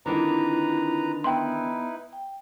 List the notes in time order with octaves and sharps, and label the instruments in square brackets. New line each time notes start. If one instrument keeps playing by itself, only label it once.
[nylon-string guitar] D3 D#3 A#3 [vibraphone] C4 E4 F4 [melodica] B4 A#5
[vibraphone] B3 [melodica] D#4 E4 B4 [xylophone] G5 C6
[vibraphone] G5